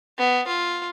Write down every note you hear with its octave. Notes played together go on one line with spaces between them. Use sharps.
B3
F4